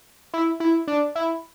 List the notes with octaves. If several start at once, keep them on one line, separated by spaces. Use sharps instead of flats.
E4
E4
D4
E4